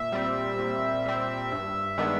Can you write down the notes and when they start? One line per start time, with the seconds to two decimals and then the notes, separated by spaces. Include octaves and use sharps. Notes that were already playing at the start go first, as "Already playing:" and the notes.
Already playing: A#2 E5
0.12 G3 C4
0.59 A#2
1.06 G3 C4
1.52 G2
1.98 D#3 G#3 B3 D4